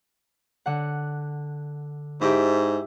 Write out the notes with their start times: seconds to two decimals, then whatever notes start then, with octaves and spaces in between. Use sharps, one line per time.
0.66 D3 F#5
2.21 G#2 E4 G4 E5